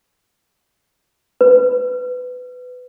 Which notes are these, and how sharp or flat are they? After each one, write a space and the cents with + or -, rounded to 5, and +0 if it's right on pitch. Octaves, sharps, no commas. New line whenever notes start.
B4 +20